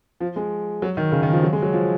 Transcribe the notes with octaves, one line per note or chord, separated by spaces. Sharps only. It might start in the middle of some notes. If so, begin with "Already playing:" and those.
F3
G#3
F#3
D#3
C#3
D#3
F3
F#3
G#3
F#3
F3